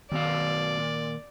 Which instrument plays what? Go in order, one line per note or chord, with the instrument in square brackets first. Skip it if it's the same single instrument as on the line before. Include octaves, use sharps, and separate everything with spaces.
[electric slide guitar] F#2 B2 F5 [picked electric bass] D#3 [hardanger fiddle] D5
[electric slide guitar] A#2